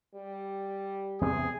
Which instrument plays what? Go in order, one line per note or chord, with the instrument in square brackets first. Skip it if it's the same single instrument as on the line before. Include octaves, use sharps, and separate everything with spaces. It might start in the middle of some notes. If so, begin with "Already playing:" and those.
[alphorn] G3
[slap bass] E2 C3 B3 [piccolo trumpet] G#4